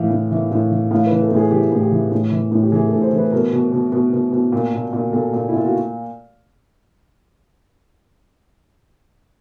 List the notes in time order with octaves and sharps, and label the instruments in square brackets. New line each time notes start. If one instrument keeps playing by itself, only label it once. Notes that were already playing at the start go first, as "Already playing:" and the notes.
Already playing: [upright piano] A2 E3 F5
A2
E3 E5
A2
E3
A2 F5
B4
E3
A4
A2
G#4
E3 G4
A2
G4
E3
A2
E3
A2
G4
E3 G#4
A4
A2
C5
E3 B4
B2 A#4
B2
B2
B2
B2
B2
A#2
A#2
A#2
A#2 A4
A#2
E4
A#2 F4
F#4